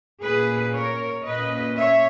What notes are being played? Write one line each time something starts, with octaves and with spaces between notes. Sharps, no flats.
A#2 A#3 C#4 G#4 B4
A#4 C#5
A#2 A#3 C#4 B4 D#5
C#5 E5